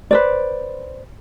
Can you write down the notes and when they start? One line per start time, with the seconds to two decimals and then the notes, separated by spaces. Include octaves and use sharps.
0.11 B4 C5 D5